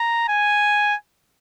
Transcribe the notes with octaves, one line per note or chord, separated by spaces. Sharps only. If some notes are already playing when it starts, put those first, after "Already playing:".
Already playing: A#5
G#5